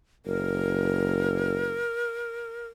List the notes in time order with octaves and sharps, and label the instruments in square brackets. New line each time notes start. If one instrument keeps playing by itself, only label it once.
[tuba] F#1 [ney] A#4